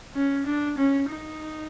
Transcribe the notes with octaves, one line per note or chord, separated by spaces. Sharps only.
C#4
D4
C#4
D#4